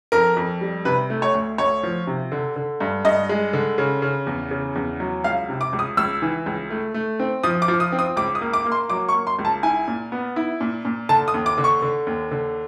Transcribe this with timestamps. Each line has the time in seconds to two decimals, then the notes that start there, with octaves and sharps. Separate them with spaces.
0.12 F2 A#4
0.37 F2
0.61 G3
0.85 C3 B4
1.10 A3
1.22 C#5
1.34 D2
1.58 D2 C#5
1.83 F3
2.07 C3
2.32 D3
2.56 D3
2.80 G2
3.05 G2 D#5
3.29 G#3
3.53 D3
3.78 C#3
4.02 C#3
4.27 E2
4.51 C#3
4.75 E2
5.00 F#3
5.24 C#2 F5
5.49 C3
5.61 D6
5.73 C#2
5.79 D#6
5.97 C#2 E6
6.22 E3
6.46 C#2
6.70 A3
6.94 A3
7.20 C4
7.44 F3 D#6
7.62 D6
7.68 F3
7.80 D#6
7.92 C4
7.99 D#6
8.17 C#2 D6
8.35 D#6
8.41 A#3
8.53 D6
8.66 A#3
8.72 C6
8.90 F#3 D6
9.09 C#6
9.14 A#3
9.27 C6
9.39 C#2
9.45 A5
9.63 E4 G#5
9.88 A#2
10.12 B3
10.36 E4
10.61 A#2
10.85 A#2
11.09 D3 A5
11.28 D#6
11.34 D#2
11.46 D6
11.58 D3
11.64 C#6
11.82 D3
12.07 D#2
12.31 D3